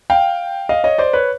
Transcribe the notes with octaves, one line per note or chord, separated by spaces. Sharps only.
F5 G5
D#5 F5
C#5 D#5
C5 D5
B4 C#5